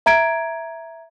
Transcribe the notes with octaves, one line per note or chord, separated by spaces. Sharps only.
E5 A#5 G#6 D7